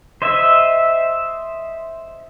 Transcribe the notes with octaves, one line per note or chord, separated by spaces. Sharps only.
C5 D#5 E5